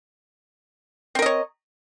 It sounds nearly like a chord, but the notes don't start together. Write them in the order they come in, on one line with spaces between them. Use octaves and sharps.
C4 A#4 D#5 C#5